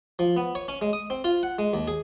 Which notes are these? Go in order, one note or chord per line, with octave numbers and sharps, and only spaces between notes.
F3
B3
C#5
C#4
G#3
D#6
C4
F4
F#5
G#3
D#2
G#4